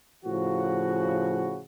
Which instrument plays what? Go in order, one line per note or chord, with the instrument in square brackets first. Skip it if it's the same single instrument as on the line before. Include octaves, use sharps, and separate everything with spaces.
[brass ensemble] A2 C#3 F3 F#4